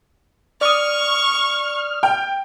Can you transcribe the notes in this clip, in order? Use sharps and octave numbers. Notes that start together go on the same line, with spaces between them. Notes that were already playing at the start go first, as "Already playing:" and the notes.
D5 C#6 D#6 F6
G5